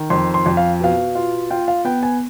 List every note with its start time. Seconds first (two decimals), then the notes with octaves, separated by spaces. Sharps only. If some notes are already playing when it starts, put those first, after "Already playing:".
Already playing: D#3
0.10 F2 C6
0.34 C6
0.46 F2
0.57 F5
0.80 B2 F5
1.15 F4
1.50 F4 G5
1.68 F5
1.85 B3 G5
2.03 G#5